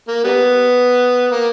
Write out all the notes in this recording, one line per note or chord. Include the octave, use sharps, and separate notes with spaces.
A#3
G3 B3
A#3